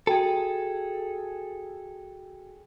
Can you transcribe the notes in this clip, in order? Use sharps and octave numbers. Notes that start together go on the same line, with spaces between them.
F#4 G#4 A4 G5